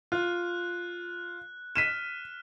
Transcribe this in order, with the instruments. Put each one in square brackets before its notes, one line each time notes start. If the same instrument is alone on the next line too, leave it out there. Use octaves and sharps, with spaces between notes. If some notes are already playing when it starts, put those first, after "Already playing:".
[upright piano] F4 [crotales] F#6
[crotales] F6 [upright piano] B6 D#7 E7